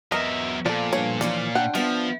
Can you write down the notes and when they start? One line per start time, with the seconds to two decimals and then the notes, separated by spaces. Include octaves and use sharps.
0.12 E2 F#3 A#4 D#5 E5
0.66 A#2 F3 F4 A4 D5
0.93 G2 C#5
1.21 D2 E3 F3 C#4 F4 D5
1.55 D4 F#5 G5
1.75 F3 B3 E5